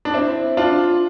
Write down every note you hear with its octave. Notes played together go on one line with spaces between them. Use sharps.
D4
C4 E4
D4 F4